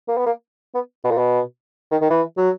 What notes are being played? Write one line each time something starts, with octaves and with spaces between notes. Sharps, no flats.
A#3
B3
A#3
B3
B2
A#2
B2
D#3
D#3
E3
F#3